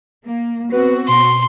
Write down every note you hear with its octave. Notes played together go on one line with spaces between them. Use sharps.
A#3
B3 C4 F#4 B4
B2 C6